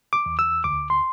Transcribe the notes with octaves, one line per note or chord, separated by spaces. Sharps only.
D6
E2
E6
D2 D6
C6